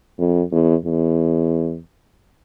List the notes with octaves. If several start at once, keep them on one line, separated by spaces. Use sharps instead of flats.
F2
E2
E2